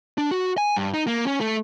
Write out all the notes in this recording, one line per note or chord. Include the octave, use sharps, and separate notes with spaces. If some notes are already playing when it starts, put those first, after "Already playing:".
D4
F#4
G#5
G2
D#4
A#3
C#4
A3